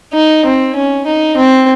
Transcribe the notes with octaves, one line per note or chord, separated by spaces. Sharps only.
D#4
C4
C#4
D#4
C4